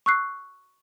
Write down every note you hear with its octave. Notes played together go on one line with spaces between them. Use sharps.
C#6 E6 F#6 C7